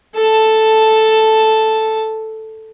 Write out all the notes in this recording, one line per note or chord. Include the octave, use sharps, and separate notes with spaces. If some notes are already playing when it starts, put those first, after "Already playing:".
A4 A5